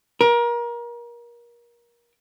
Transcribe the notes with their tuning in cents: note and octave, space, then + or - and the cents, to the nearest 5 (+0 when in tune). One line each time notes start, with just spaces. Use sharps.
A#4 +30